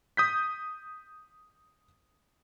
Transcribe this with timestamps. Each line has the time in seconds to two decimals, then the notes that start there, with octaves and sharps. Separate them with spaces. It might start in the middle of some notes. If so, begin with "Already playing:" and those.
0.17 D#6 G6 B6